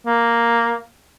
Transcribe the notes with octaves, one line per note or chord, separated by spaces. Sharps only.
A#3